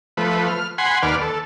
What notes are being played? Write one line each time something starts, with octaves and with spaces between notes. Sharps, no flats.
F3 A3 B4
F6
F#5 G#5 B5 C6
D#2 B4 D5 F6
A4